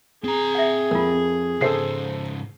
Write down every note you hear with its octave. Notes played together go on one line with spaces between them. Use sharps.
C4 G#4 A#5
E5 F#5
F2 F4 A#4
G#2 C#3 A4 C5 C7